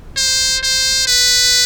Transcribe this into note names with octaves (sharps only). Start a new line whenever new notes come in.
C5
C5
B4